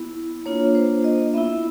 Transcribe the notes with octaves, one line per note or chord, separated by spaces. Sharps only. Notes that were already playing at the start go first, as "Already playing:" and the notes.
Already playing: B3 E4
A#3 D4 F4 C#5
C5
D#5
B3 E4 E5